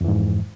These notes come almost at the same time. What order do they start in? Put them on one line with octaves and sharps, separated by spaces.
F2 E3 G#2